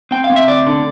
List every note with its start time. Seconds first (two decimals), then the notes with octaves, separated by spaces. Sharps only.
0.11 C4 G5
0.24 F5
0.30 C4
0.36 E5
0.47 D2 D5
0.67 D3